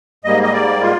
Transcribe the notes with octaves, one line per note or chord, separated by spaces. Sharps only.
G#2 G3 A#3 D#5
D#5
D5
F4